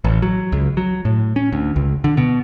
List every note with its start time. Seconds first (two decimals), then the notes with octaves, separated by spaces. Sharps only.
0.04 A1
0.22 F#3
0.52 C#2
0.77 F#3
1.05 A2
1.36 C#4
1.52 D2
1.76 C#2
2.04 D3
2.17 B2